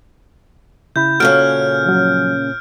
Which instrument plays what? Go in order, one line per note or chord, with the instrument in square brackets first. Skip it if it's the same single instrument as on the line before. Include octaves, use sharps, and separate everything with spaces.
[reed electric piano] C#3 E4 B5 [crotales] G6
[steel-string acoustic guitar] A#2 C#3 C#4 [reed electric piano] F#4 A4 C#5 [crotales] F6 D7
[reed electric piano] F3 F#3